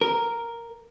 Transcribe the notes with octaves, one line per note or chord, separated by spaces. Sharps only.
A#4